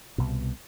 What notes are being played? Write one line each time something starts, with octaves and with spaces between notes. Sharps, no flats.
C2 B2